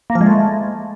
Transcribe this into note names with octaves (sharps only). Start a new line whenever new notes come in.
A#3
F3
G#3
A3